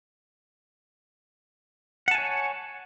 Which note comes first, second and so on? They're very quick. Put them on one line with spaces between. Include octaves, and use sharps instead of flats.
F#5 A5 G#5 C#5